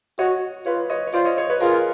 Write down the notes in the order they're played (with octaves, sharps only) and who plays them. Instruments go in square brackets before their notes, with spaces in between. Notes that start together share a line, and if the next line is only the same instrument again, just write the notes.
[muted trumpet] F#4 [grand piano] C#5 D#5
[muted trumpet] F4 [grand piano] B4 C#5
[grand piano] C#5 D#5
C#5
[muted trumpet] F4 [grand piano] C5 D5
[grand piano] C#5 D#5
C#5 D#5
B4 C#5
[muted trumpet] F4 [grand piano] G#4 A#4